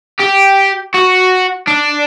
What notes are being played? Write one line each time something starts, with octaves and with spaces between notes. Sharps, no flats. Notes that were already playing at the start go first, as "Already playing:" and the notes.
G4
F#4
D4